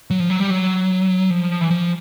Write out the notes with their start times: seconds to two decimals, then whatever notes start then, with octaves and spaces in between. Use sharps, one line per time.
0.10 F#3
0.20 F3
0.30 F#3
0.40 G3
0.50 F#3
1.31 F3
1.61 E3
1.71 F3